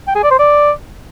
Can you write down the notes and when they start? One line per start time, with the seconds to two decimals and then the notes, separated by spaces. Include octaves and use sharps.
0.07 G5
0.15 G#4
0.23 D5
0.31 C5
0.39 D5